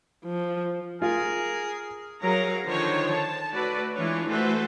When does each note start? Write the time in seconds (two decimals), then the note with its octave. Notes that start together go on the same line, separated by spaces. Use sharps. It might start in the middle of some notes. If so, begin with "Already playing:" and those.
0.25 F3
1.02 F4 G#4 A#4 G#5
2.21 F#3 G#4 A#4 C#5 F5 A#5
2.65 D3 D#3 F3 C5 C#5
3.10 A5
3.53 A3 F#4 A4 B4 D5
3.94 E3 G#3 D4 F4 C#5
4.29 E3 A3 F#4 A4 B4 C5